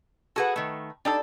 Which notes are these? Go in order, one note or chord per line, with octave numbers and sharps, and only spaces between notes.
F#4 G#4 A4 B4 F#5
D#3 A3
G3 D4 D#4 A4